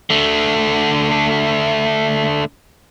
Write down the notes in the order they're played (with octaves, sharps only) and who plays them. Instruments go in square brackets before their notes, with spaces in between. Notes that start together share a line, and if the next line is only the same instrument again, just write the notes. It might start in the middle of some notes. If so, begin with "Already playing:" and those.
[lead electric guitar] D3 A3